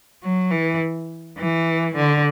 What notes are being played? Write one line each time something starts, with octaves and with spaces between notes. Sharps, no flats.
F#3
E3
E3
D3